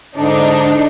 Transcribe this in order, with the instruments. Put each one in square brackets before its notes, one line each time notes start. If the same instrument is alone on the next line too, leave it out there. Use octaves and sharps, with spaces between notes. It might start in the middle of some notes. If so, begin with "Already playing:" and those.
[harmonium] G#2 D3 [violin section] D4 D#4